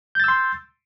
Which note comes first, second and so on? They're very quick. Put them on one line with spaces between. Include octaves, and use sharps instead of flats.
G6 A6 E6 C6